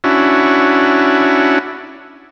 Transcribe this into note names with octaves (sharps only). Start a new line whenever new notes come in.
C#4 D4 E4 F#4